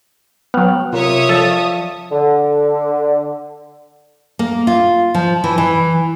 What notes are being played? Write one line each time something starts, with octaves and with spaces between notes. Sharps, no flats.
F#3 B3 G5 F6 F#6
C3 F4 A#4 C#5 E5 D#6
F3 A4 D5 F5 A5 A6
D3
A#3
F4
F3
E3
E3